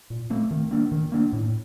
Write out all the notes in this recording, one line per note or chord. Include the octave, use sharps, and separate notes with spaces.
A#2
A3 C4
D#3
A#3 D4
D#3
A#3 D4
A2